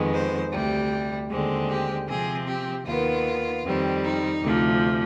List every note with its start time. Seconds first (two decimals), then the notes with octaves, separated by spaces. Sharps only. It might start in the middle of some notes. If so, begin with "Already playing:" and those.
Already playing: F2 D#3 G#3 B3
0.13 C5
0.52 D2 C3 G3
1.30 D#2 D3 G#3 C4
1.69 G4
2.08 C3 F3 C4 G#4
2.47 G4
2.86 D#2 D#3 B3 F4
3.64 F2 D#3 G3 C4
4.03 D#4
4.42 D2 C3 F3